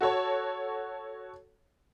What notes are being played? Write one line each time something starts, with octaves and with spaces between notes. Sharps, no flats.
F#4 A4 C#5 A5